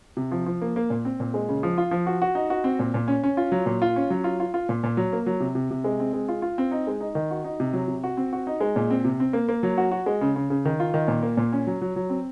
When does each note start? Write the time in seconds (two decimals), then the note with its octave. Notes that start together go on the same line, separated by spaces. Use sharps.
0.17 C3
0.32 F3
0.46 F3
0.62 A#3
0.76 A#3
0.90 A#2
1.05 C4
1.20 A#2
1.34 G#3
1.49 C#3
1.63 F3
1.78 F4
1.91 F3
2.07 F#4
2.22 F#4
2.35 D#4
2.50 F#4
2.64 C4
2.79 A#2
2.94 A#2
3.08 C#4
3.23 C#4
3.37 F4
3.52 F#3
3.66 A#2
3.82 F4
3.96 C#4
4.10 F#3
4.24 F4
4.40 F4
4.54 F4
4.69 A#2
4.83 A#2
4.97 F#3
5.13 A#3
5.26 F#3
5.40 C3
5.55 C3
5.71 C3
5.84 G#3
6.00 C4
6.13 G#3
6.29 F4
6.42 F4
6.58 C4
6.71 D#4
6.87 G#3
7.01 D#4
7.15 D#3
7.31 F#4
7.44 D#4
7.60 C3
7.73 F#3
7.88 C3
8.04 F#4
8.17 C4
8.33 F#4
8.47 D#4
8.61 G#3
8.76 A#2
8.90 C4
9.05 C3
9.20 C4
9.33 A#3
9.49 A#3
9.63 F#3
9.78 F#4
9.91 F#4
10.06 G#3
10.21 C#3
10.36 C#3
10.50 C#3
10.65 D#3
10.80 F4
10.94 D#3
11.08 A#2
11.23 A#3
11.37 A#2
11.53 C#4
11.67 F#3
11.82 F#3
11.96 F#3
12.10 C4